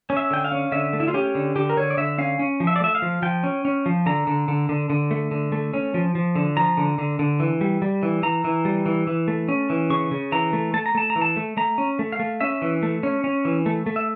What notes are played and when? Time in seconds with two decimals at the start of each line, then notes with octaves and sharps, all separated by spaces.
0.10 C#4
0.17 E5
0.31 D3 G5
0.44 F5
0.52 C#4
0.72 D3 E5
0.93 A3
1.00 E4
1.08 F4
1.14 C#4 G4
1.35 D3
1.56 D3 G4
1.70 A#4
1.77 D3 C#5
1.90 D5
1.97 D3 E5
2.18 C#4 F5
2.39 C#4
2.60 F3
2.67 E5
2.76 D5
2.81 A3 E5
2.95 F5
3.02 F3
3.22 F3 G5
3.44 C#4
3.65 C#4
3.86 F3
4.06 D3 A#5
4.27 D3
4.48 D3
4.69 D3
4.90 D3
5.11 A3
5.31 D3
5.52 A3
5.74 C#4
5.94 F3
6.15 F3
6.35 D3
6.57 F3 A#5
6.77 D3
6.98 D3
7.19 D3
7.40 E3
7.61 G3
7.82 G3
8.03 E3
8.23 E3 A#5
8.44 E3
8.65 G3
8.86 E3
9.07 E3
9.28 A3
9.48 C#4
9.70 E3
9.90 C#3 C#6
10.11 C#3
10.32 E3 A#5
10.53 A3
10.74 A3 A5
10.86 A#5
10.95 A3 A5
11.10 A#5
11.16 E3
11.22 A5
11.37 A3
11.57 A3 A#5
11.78 C#4
11.99 A3
12.12 F5
12.19 A3
12.40 C#4 E5
12.62 E3
12.83 A3
13.03 C#4
13.24 C#4
13.45 E3
13.66 A3
13.86 A3
13.96 E5